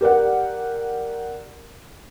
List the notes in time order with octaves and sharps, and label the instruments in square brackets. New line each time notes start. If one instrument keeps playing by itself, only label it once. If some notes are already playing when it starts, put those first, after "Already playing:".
[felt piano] G4 A#4 D5 F#5